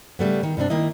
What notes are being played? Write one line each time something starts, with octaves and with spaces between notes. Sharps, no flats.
C#3 G3 A3 B3
D#3
G2 C3 C4 D4
D#3 A#3 E4 D#5